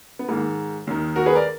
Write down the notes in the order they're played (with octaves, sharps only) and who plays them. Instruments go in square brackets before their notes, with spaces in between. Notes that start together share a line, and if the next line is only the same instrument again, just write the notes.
[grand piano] B3
G#2 D#3 A#3
D#2 D#3
F#4 A#4
G#4 B4
A#4 D5